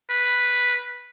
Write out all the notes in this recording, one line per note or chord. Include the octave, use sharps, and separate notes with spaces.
B4